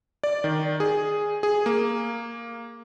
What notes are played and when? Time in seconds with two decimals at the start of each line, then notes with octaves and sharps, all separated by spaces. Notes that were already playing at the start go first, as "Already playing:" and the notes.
0.24 D5
0.44 D#3
0.80 G#4
1.43 G#4
1.66 A#3